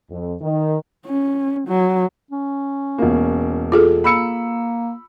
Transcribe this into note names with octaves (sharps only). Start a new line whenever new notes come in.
F2
D#3
C#4
F#3
C#4
E1 A#3
F4 G#4 A4
A#3 B5 E6 C#7